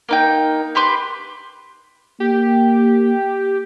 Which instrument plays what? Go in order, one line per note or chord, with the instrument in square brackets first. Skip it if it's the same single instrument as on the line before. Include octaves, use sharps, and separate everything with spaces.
[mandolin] A#3 D#4 G5
G4 B4 C6 D6
[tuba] A#3 [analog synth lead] G4